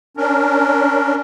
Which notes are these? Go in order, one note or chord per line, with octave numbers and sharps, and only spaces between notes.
C#4 D4 A#4